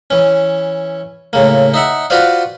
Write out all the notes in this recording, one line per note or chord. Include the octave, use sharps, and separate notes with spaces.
E3 C#4
A2 C#3 A#3
D#4 E5 F#5
F4 F#4 B4 C5 D5 F5